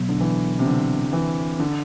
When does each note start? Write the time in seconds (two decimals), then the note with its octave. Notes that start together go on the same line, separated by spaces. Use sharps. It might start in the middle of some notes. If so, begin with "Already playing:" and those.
Already playing: B2 F#3 B3
0.09 D3
0.21 E3
0.59 C3
0.66 D3
1.13 E3
1.59 D3